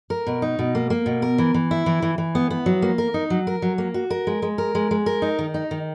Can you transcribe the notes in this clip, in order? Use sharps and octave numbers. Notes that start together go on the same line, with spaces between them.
A#4
B2
D#4
B2
A#3
A#3
B2
A#4
E3
E3
E4
E3
E3
E3
B3
B3
F#3
A#3
A#4
D#4
F#3
A#4
F#3
A#3
F#4
A#4
G#3
G#3
A#4
G#3
G#3
A#4
D#4
D#3
D#4
D#3